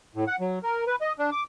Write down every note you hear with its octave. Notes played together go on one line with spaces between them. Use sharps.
A2
F#5
F#3
A#4
B4
D#5
D4
D6